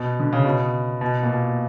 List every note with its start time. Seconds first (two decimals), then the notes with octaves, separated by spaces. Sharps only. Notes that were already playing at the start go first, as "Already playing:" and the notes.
Already playing: B2
0.20 D3
0.33 C#3
0.44 B2
1.01 B2
1.23 A#2
1.29 B2